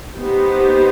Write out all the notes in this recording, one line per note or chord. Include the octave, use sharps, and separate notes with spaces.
B3 D#4 G4 C5